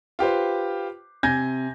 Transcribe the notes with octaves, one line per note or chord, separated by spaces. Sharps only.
F4 G4 B4 C5
C3 G#5 G6 G#6 A#6